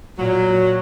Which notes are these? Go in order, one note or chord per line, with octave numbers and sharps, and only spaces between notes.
A#2 F#3